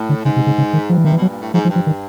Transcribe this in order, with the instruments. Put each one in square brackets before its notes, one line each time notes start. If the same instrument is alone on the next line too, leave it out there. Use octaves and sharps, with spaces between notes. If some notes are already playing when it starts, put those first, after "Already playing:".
Already playing: [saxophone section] A2
[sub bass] D3
[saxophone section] G#2 [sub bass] C#3
[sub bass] C3
C#3
C#3
D#3
[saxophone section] G2 [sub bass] F3
[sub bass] E3
[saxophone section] C3 [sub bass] D#3
[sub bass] E3
[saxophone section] B2
[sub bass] F#3
[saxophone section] A#2
A2
[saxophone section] G#2 [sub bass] F3
[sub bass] F3
[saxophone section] G2
[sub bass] F3
D#3